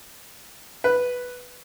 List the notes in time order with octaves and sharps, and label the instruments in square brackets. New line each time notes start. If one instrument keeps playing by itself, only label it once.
[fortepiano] B4